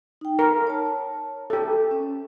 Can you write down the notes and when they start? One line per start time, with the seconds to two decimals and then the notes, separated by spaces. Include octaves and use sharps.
0.21 D#4 G5
0.39 A#4
0.67 C#5 A5
1.50 G4 A4
1.91 C#4